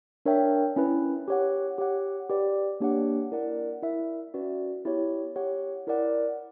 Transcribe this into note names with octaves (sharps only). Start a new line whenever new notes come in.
D4 A#4 C#5 E5 G5
C#4 E4 B4
G4 C#5 F#5
G4 C#5 F#5
G4 B4 D5
A#3 D4 G4 C#5 F#5
E4 A#4 D5 F#5
E4 A#4 E5
C#4 F#4 B4 D5
B3 E4 G4 C#5
G4 C#5 F#5
E4 A#4 D5 F#5